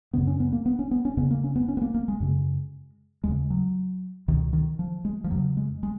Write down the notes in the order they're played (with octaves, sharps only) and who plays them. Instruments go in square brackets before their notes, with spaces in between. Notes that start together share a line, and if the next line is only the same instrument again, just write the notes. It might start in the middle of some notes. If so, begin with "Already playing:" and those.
[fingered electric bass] F#2 C#3 B3
C#4
B3
A#3
B3
C#4
B3
C#4
F2 C#3 B3
A#3
C#4
B3
C#4
B3
A#3
A#3
G#3
F#2 C#3
D#2 C#3 G#3
F#3
C#2 B2 D#3
D#3
F3
G#3
F3
F2 C#3 F#3
G#3
G#3